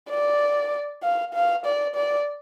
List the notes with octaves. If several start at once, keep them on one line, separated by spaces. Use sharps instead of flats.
D5
F5
F5
D5
D5